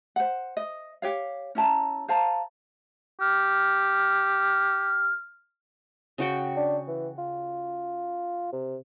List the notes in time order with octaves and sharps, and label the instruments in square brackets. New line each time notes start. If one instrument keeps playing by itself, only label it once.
[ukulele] C5 F#5
D#5
G4 C#5 F5
C#4 E4 A5 A#5
C5 F5 A5 A#5
[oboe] G4 [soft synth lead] F6
[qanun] C#3 F#4 G5
[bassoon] D4
E3
F4
C3